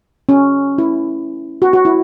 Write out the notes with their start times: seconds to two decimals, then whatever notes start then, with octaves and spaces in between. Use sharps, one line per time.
0.29 C#4
0.78 E4
1.62 F#4
1.73 F#4
1.85 E4